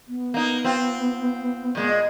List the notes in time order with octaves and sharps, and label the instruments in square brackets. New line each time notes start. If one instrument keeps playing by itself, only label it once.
[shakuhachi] B3
[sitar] A#3 D#4
C4 F4
A#2 G#3
[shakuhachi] D#5